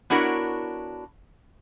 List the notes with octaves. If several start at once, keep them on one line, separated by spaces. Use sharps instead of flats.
B3 D4 E4 F#4 A#4 C#5